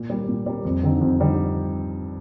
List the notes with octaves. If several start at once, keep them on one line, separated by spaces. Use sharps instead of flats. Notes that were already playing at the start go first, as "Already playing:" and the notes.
Already playing: A#2
G3 A#3
A#2
G3 A#3
F2
D3 G3 C4 D#4
F2
D3 G3 C4 D#4